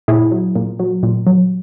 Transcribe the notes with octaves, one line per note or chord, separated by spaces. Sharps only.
A#2 E4 G#4
F#3
A#2
F#3
A#2
F#3